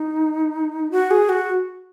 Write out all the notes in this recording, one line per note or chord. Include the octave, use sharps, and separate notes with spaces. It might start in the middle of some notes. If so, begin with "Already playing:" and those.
Already playing: D#4
F#4
G#4
F#4